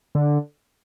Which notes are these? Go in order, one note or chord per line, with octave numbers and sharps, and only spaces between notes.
D3